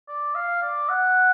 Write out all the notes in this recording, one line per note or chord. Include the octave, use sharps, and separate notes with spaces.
D5
F5
D5
F#5